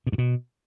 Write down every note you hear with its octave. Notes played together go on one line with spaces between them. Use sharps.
B2
G2
B2